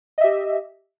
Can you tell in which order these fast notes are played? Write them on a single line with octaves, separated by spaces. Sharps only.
D#5 E5 G4